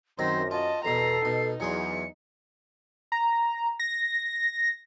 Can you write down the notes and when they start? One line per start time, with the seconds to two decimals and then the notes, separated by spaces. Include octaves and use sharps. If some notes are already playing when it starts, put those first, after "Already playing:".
0.19 F#2 D#3 F#3 C4 C5 A#6
0.51 F4 D#5 A5
0.85 E2 B2 A4 A#5 C7
1.25 B2 D#4
1.60 E2 F#3 G#4 C6 C#7
3.12 A#5
3.80 A#6